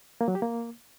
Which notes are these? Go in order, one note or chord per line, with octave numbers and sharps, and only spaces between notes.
A#3
F#3
G4
A#3